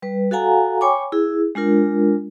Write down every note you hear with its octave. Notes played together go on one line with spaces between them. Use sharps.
G3 B4
F#4 A4 F5 F#5 G#5 A#5
C#5 G5 G#5 B5 C#6 D6
E4 G#4
G#3 D4 F4 A#4